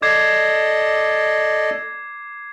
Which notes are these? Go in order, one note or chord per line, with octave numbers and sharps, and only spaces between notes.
A4 D5 D#5 D6 G#6 C7